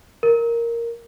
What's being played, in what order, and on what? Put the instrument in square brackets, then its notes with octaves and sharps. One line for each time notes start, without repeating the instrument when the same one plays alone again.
[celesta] A#4